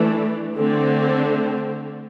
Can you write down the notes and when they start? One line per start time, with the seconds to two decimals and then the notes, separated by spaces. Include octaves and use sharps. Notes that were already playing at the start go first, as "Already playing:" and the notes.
Already playing: E3 A3 D4
0.58 D3 A3 C4